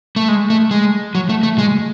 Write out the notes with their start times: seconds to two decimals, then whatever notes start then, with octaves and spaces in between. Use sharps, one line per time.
0.16 A3
0.28 G#3
0.50 A3
0.71 G#3
1.15 F#3
1.29 A3
1.43 A3
1.58 G#3